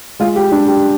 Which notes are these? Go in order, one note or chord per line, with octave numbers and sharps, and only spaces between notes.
G#3 F4
G4
D4
G4